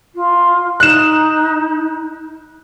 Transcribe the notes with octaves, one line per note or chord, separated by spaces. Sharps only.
F4
D#4 F#6 E7